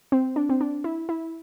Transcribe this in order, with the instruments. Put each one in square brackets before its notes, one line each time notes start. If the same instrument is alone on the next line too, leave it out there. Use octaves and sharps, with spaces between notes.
[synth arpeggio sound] C4
D4
C4
D4
E4
E4